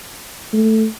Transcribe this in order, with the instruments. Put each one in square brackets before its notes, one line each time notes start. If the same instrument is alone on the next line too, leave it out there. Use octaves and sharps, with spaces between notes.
[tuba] A3